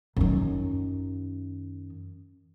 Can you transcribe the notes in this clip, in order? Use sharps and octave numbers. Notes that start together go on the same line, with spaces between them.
F#2 D#3